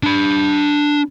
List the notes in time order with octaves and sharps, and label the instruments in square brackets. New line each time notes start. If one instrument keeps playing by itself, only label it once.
[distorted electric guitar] D4 B5